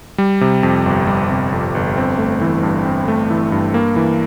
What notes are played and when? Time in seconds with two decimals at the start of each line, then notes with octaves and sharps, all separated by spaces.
0.18 G3
0.41 C3
0.63 F2
0.86 G1
1.07 G3
1.30 C3
1.52 F2
1.75 G1
1.97 C4
2.18 A3
2.41 E3
2.63 G2
2.85 C4
3.08 A3
3.30 E3
3.52 G2
3.74 A#3
3.96 E3